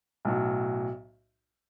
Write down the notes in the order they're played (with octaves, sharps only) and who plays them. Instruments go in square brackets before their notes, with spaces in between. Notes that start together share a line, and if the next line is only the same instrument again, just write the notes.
[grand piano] B1 A2 F#3